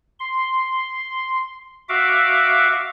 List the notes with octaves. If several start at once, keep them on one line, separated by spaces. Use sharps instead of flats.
C6
F#4 E5 F5 D6